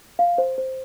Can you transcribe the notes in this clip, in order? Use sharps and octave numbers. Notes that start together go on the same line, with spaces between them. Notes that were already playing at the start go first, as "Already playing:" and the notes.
F5
C5
C5